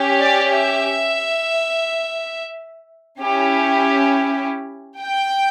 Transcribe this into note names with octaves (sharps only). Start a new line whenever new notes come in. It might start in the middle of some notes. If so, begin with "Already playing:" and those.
Already playing: C#4 G4
D5
E5
C#4 E4 G4
G5